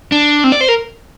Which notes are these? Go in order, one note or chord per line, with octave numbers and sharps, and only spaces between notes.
D4
C4
D5
C5
A#4